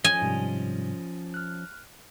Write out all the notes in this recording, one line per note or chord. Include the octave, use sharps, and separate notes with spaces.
F3 C#4 D#5 G#5
G#2 C3 G3
F6 F#6